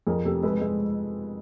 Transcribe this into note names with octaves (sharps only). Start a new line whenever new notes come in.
F2 G#4 A#4
C3 G4 A4
G#3 A4 B4
G#3